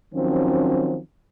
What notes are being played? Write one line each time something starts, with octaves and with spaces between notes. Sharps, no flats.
D#3 F3 F#3 C4 C#4